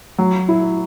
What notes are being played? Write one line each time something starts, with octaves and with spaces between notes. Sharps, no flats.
F#3
E4